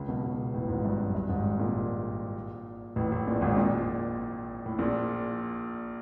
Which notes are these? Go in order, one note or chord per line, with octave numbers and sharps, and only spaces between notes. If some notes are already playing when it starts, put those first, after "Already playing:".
Already playing: C#2 C#3
B1 B2
B1 B2
A1 A2
G#1 G#2
G2
F#2
G2
G#1 G#2
A#1 A#2
A1 A2
A1 A2
A#1 A#2
G#1 G#2
A#1 A#2
A2
A#1 A#2